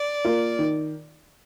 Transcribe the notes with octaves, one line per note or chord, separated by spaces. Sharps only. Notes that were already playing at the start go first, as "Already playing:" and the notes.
Already playing: D5
A#3 F4
D#3